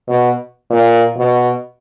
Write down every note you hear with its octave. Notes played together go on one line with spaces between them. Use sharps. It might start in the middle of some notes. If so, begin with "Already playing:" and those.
B2
A#2
B2